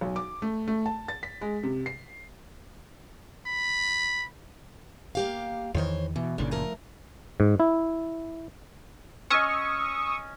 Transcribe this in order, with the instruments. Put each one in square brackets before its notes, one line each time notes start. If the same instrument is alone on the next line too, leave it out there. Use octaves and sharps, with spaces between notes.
[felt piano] B1
D6
A3
A3
A5
A6
B6
G#3
C3
C7
[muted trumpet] B5
[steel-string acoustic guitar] A#3 G4 F5
[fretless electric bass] E2 D#3 E3 [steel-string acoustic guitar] C5 C#5
[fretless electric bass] B2 [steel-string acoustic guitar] E3
[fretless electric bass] F#1 A#2 C#3 [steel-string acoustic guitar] D4
[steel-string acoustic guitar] F3 A3 A#4
[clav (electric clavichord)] G#2
E4
[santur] C#4 C#5 D#5 [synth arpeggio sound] C#6 D#6 E6